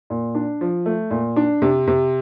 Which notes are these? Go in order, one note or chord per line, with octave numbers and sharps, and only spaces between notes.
A#2
D4
F3
A3
A#2
D4
C3
C3